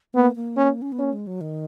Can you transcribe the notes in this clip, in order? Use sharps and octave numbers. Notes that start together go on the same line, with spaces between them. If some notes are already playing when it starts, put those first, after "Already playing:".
A#3 B3
A#3
C#4
C#4
B3
A#3 C#4
G#3
F#3
D#3